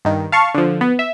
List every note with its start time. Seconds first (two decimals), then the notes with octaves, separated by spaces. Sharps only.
0.05 G2 D#3
0.32 F5 A5 C#6
0.55 D3 F3
0.81 B3
0.99 E5